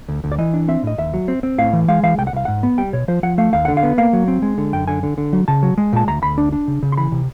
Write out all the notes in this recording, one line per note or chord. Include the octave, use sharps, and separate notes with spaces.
D2
D2
D5
E3 D#5
D4
C4 E5
A2 D#5
D#2 E5
F#3
C4
C4
A2 F5
E3
G#3 F5
E3 F5
C2 G5
F#5
C2 F5
G#2 F#5
B3
G3 G5
B2 C#5
F3 C5
F3 F#5
A3 F5
D#2 F5
D3 F#5
F5
B3
A#3 F5
F#3
C4
G#3
D3
F#2 G5
D3 G#5
D3
D3
F#3
C#3 A5
F#3
G#3
A#2 A5
D2 A#5
D2 B5
D4
D4
C#3
C#3
C6
E3 B5
C3